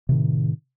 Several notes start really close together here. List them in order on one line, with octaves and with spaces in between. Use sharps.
C3 D#3 A2